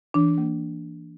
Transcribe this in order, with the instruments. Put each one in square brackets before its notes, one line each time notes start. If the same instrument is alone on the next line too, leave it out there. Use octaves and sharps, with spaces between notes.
[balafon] E3 [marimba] D4
[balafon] A#3